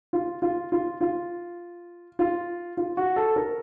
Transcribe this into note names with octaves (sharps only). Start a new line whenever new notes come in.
F4
F4
F4
F4
F4
F4
F#4
A4
A#4